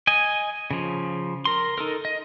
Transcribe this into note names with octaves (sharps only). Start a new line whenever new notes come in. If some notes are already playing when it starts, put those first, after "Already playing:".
D#5 G#5
C#3 F3
A#4 C6
D#4 A4 A#4
D#5